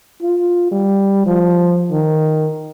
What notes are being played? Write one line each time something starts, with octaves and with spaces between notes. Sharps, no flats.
F4
G3
F3
D#3